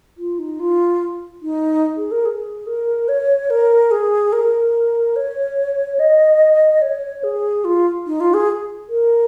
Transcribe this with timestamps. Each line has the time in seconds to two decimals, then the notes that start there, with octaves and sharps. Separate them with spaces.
0.18 F4
0.39 D#4
0.59 F4
1.42 D#4
1.97 G#4
2.11 A#4
2.25 G#4
2.67 A#4
3.08 C#5
3.50 A#4
3.91 G#4
4.33 A#4
5.16 C#5
5.99 D#5
6.82 C#5
7.24 G#4
7.64 F4
8.07 D#4
8.20 F4
8.34 G#4
8.89 A#4